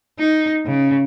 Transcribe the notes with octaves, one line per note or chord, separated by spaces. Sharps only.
D#4
C#3